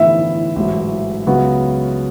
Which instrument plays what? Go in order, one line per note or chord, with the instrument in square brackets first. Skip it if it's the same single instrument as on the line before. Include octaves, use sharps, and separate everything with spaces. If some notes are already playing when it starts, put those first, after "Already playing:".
Already playing: [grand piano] A2 E3 B3 E4 [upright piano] E5
[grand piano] A1 G#2 F#3
C#2 C#3 F#3 B3 F#4